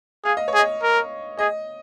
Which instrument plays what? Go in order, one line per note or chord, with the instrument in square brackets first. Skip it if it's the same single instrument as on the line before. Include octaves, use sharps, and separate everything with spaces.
[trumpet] G#4 [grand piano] F5
[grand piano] D#5
C#5
[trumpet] G#4
[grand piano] D#5
[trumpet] A#4
[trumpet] G#4 [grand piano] D#5